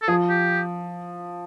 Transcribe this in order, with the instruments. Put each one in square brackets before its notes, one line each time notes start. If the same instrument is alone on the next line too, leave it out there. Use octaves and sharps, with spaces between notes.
[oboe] A4
[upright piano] F3 [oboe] G#4
[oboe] G4